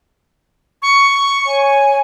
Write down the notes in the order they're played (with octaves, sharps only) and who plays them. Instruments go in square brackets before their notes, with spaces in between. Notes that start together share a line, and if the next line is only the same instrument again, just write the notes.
[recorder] C#6
[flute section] C#5 G#5